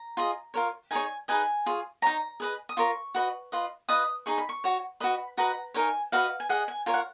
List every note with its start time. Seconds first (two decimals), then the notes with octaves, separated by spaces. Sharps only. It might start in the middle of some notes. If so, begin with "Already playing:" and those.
Already playing: A#5
0.17 F4 G#4 D#5
0.54 F4 A#4 C#5
0.91 D#4 G#4 C#5 G#5
1.28 D#4 G#4 B4 D#5 G#5
1.66 F4 G#4 C#5
2.02 D#4 F#4 C#5 A#5
2.40 G#4 B4 D#5
2.69 D#6
2.77 F4 A#4 C#5 C#6
3.15 F#4 B4 D#5
3.52 F4 B4 D#5
3.89 F4 B4 D#5 D#6
4.26 D#4 G#4 D#5 C#6
4.38 B5
4.49 C#6
4.64 F#4 C#5
5.00 F#4 B4 D#5 B5
5.37 F#4 B4 D#5 A#5
5.74 D#4 A#4 C#5 G#5
6.12 F#4 B4 D#5 F5
6.40 G#5
6.49 G#4 D#5 F#5
6.68 G#5
6.86 F4 A#4 C#5 G#5
6.94 F#5